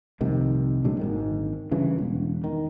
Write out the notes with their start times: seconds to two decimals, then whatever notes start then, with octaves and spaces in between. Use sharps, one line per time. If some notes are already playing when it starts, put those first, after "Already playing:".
0.21 F1 C2 C3 D#3
0.84 A#2 D3 F#3 G#3
0.99 G#1 G#2 D#3
1.71 G2 C#3 E3
1.98 E1
2.44 D#3